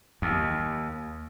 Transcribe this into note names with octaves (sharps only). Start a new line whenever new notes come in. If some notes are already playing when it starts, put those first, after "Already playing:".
D#2